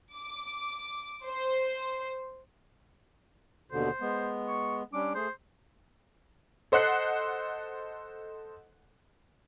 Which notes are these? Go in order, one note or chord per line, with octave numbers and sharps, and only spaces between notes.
D6
C5
D#2 B2 D3 C5
G#3 B3
C#6
G3 C#4 D4 D6
A3 G#4 C5
A4 C5 D#5 F#5 F#6 C7